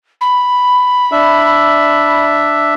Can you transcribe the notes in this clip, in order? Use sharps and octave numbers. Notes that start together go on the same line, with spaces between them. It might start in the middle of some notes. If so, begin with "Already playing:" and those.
B5
D4 E5